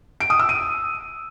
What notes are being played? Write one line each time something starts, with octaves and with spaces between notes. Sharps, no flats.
D7
D#6
E6
D#7